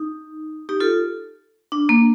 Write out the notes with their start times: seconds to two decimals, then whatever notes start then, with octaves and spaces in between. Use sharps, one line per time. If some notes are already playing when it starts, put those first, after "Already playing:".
Already playing: D#4
0.69 D#4 G4
0.80 F4 A4
1.72 D4
1.89 A#3